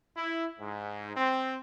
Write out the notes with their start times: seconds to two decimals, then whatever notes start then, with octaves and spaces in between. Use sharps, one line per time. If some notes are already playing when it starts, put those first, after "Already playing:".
0.17 E4
0.60 G#2
1.17 C4